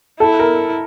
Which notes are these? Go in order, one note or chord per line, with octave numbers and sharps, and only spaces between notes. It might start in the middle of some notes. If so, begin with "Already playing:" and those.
E4 A4
A#4